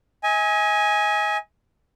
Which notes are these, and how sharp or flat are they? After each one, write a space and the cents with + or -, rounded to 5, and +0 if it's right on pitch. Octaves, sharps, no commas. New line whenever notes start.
D#5 +40 G#5 +0